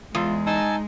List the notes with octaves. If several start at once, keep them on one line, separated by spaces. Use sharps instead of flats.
E2 G#3 F4
D#4 G#5 A5 E6